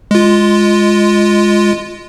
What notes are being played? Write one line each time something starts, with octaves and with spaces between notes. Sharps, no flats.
G#3 F4